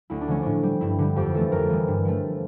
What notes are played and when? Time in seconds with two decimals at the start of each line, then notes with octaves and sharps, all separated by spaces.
0.10 D2 E4
0.21 D4
0.28 D3 F3 A3 C#4
0.42 A2 D4
0.63 G3
0.81 G2 E4
0.99 D3 G3
1.16 F2 G4
1.34 E3 A3 A4
1.52 F2 A#4
1.70 E3 G3
1.88 G2
2.05 F3 A3